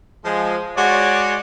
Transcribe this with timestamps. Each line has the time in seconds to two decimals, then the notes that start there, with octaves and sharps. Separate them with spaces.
0.24 F3 G#3
0.76 G#3 F#4 C#5 D5